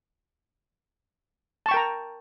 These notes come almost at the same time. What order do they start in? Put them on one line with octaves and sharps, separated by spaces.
A5 C#6 G5 A#4 A#5